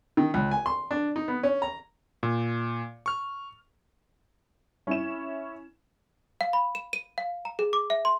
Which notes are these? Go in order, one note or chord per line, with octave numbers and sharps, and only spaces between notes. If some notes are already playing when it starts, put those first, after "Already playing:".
D#3
C#2
G#5
C6
D4
D#4
B3
C#4
A#5
A#2
C#6 F6
C#4 E4 E7
F5
B5
E7
D#7
F5
A#5
G#4
D6
E5
C6